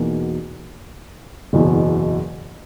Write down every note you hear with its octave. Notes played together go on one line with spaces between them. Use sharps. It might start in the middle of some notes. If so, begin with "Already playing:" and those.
Already playing: E2 B2 A#3 D#4 F#4
F#1 E2 B2